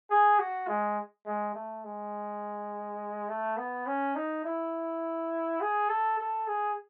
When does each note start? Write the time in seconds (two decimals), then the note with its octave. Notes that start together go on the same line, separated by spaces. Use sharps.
0.10 G#4
0.39 F#4
0.68 G#3
1.26 G#3
1.55 A3
1.84 G#3
3.29 A3
3.57 B3
3.86 C#4
4.15 D#4
4.44 E4
5.61 G#4
5.89 A4
6.18 A4
6.47 G#4